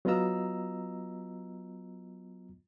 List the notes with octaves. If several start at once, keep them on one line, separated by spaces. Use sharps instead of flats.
F#3 B3 F4 D#5 A#5 E6